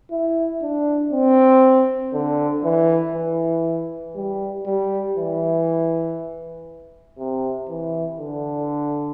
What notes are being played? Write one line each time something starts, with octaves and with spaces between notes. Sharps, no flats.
E4
D4
C4
D3
E3
E3
G3
G3
E3
C3
E3
D3